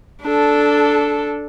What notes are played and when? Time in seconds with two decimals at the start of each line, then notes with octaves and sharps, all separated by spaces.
0.23 D4 A4